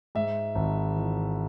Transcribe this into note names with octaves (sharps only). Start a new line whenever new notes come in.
G#2 E5
G#1
E3